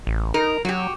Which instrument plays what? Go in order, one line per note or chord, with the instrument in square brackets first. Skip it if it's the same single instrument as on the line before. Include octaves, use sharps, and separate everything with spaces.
[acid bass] A1
[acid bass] D#4 [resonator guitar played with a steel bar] A#4
[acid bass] F#3 [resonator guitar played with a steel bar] F#4 G4